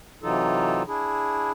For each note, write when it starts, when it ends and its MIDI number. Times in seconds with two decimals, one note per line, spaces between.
0.23 0.83 48
0.23 0.83 52
0.23 0.83 54
0.23 0.83 63
0.23 0.83 65
0.23 0.83 69
0.87 1.52 62
0.87 1.52 64
0.87 1.52 68